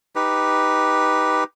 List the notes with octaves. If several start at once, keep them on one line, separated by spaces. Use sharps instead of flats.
D#4 G4 B4